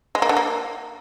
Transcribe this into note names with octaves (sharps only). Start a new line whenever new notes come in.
G#3
A#3
D3
A#3